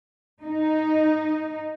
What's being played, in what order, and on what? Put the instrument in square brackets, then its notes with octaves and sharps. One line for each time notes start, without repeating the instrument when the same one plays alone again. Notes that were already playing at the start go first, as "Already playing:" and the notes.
[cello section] D#4